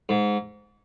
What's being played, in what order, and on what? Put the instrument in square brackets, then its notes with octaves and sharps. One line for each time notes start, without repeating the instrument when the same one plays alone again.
[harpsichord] G#2